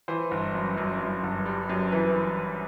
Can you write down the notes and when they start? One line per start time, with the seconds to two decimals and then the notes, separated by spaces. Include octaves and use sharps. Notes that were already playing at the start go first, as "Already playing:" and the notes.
0.08 E3 C5
0.31 G1
0.55 F#2
0.77 F#2
1.01 F#2
1.23 G1
1.46 G3
1.69 F#2
1.92 E3 B4